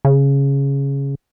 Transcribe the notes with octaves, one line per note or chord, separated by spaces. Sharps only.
C#3